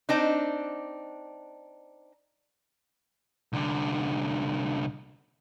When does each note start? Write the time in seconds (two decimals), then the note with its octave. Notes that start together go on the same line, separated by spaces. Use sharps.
0.09 C4 D4 D#4
3.53 C2 D3